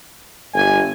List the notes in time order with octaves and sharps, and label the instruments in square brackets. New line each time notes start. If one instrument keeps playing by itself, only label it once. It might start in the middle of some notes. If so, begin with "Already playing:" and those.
[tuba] G1 [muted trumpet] G#5